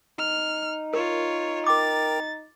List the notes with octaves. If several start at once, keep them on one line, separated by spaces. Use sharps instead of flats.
D#4 F6
F4 A#4 C#5
A#4 G5 A#5 D6 A6